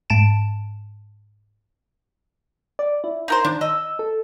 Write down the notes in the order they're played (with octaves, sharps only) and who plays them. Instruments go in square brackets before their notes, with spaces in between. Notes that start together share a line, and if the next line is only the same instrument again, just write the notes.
[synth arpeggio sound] G#2 A5 D7 E7
[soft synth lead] D5
E4
[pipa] D#4 A#4 C5
[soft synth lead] D#3 [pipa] D4
[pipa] D#5 [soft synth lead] E6
[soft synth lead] A4